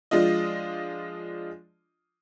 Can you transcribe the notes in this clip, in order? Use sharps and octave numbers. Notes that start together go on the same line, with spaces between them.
F3 G#3 D4 F4 D#5